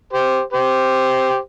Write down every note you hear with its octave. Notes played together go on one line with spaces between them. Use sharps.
G4 C5
G4 C5